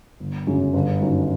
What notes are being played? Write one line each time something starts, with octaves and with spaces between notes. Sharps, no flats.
G1
F#2 C#3
G1
F#2 D#3